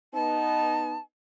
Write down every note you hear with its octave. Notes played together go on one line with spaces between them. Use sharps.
B3 D#4 A5